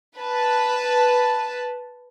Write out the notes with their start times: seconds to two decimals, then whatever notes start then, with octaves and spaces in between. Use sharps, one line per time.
0.17 B4 A5